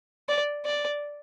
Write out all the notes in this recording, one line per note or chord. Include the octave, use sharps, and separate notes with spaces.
D5
D5